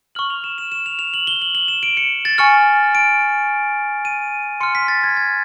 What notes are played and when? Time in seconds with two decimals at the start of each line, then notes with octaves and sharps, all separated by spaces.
0.15 C#6 F6 F#7
0.30 F7
0.44 E7
0.58 E7
0.72 E7
0.86 F7
0.99 F7
1.14 F#7
1.27 G7
1.42 F#7
1.55 F#7
1.68 E7
1.83 D7
1.97 C#7
2.25 A6
2.38 G#5 C#6 F6 C#7
2.95 D7
4.05 D#7
4.60 C6 F6 C#7
4.75 B6
4.88 A6
5.03 G#6
5.17 G#6